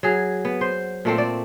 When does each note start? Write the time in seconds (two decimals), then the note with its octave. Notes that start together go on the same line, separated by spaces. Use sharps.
0.03 F#3 G#4
0.45 B3
0.61 C5
1.05 A#2 A3 C4
1.18 D5